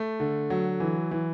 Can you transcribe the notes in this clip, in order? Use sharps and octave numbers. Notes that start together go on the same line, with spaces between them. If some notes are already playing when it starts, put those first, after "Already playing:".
Already playing: A3
D3
F#3
E3
E3